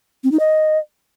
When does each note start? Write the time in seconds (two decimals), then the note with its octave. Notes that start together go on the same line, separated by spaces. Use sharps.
0.24 C4
0.32 D#4
0.40 D#5